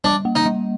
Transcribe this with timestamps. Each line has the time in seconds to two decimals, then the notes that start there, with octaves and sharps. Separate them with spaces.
0.04 G3 D4
0.25 A#3
0.35 D#4
0.46 G3